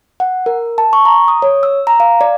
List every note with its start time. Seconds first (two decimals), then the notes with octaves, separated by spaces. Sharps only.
0.20 F#5
0.46 A#4
0.78 A5
0.93 C#6
1.05 A#5
1.28 D#6
1.42 C#5
1.63 E6
1.87 A#5
2.00 F5
2.21 D5